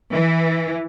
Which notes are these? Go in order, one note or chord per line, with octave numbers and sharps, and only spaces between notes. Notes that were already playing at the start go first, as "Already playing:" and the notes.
E3